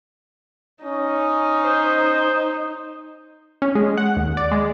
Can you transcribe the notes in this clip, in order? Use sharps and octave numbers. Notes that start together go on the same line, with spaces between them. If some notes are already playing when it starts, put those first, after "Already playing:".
C#4 D#4
C5
C#4
G#3
F#5
D#2
D5
G#3